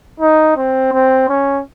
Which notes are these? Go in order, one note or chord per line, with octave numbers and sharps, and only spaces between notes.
D#4
C4
C4
C#4